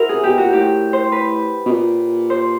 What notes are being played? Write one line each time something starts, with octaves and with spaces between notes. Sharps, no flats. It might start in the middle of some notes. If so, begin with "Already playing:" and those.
Already playing: E4 F#4 A#4 C5
C3 G#4
B2 G4
A#2 F#4
A2 G4
C5
B4
B2
A#2
C5